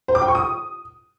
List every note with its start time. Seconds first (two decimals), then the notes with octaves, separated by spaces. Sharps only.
0.08 C5
0.15 D6
0.22 G5
0.28 C#6
0.35 D#6